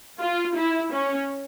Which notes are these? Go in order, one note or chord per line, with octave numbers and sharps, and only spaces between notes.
F4
E4
C#4